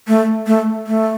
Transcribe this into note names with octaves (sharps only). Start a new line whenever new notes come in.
A3
A3
A3